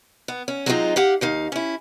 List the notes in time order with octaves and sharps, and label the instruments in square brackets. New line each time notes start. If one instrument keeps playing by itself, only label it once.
[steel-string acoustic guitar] B3
C#4
F#3 G#3 C4 D4 D#4 F4
G4 F5 F#5
D#2 D#4 F5
C#4 E4